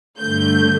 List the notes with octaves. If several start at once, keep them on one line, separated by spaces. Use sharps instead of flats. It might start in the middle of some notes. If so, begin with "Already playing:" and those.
G2 D3 A3 G6